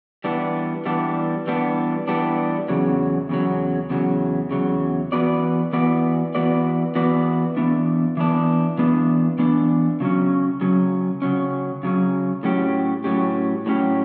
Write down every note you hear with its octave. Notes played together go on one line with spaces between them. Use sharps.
E3 G3 B3 D4
E3 G3 B3 D4
E3 G3 B3 D4
E3 G3 B3 D4
E2 C#3 F#3
E2 C#3 F#3
E2 C#3 F#3
E2 C#3 F#3
E3 B3 F#4 B4 D5
E3 B3 F#4 B4 D5
E3 B3 F#4 B4 D5
E3 B3 F#4 B4 D5
E3 B3 D4
E3 B3 D4
E3 B3 D4
E3 B3 D4
C#3 F#3 C#4
C#3 F#3 C#4
C#3 F#3 C#4
C#3 F#3 C#4
A2 F#3 C#4 G4
A2 F#3 C#4 G4
A2 F#3 C#4 G4